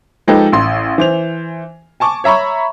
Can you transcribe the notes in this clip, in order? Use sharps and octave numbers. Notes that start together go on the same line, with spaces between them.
F3 G#3 D#4 G4 A4 B4
A1 C6
E3 C5 F7
G#5 A5 C#6 D6
C#5 E5 A#5 B5 C#6